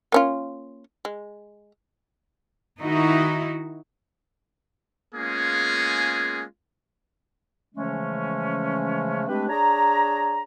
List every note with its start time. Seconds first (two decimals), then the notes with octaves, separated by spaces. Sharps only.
0.12 A#3 C#4 F4
1.05 G#3
2.79 D#3 D#4 E4 F#4
5.14 G#3 A#3 B3 C#4 F4 G#4
7.75 C#3 E3 F3 G#3 A3 C#4
9.28 G#3 A3 C4 D4 G4 B4
9.49 D4 G#4 C#5 A#5